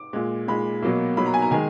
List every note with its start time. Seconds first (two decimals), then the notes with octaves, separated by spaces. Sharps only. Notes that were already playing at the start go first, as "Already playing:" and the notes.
Already playing: D6
0.13 A#2 G#3
0.48 A#2 G#3 B5
0.82 B2 F#3 A#3
1.17 B2 F#3 A#3 B5
1.26 A#5
1.34 G#5
1.42 A#5
1.51 D#3 G#3 G#5